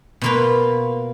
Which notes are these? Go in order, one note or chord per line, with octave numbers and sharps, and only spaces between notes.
B2 A#3 F4 B4